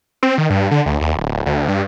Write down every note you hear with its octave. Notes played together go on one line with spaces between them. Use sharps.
C4
D#3
G2
D3
D2
D#2
D1
D2
G2